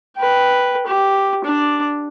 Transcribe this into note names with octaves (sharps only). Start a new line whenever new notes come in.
B4 G5
G4
D4 D5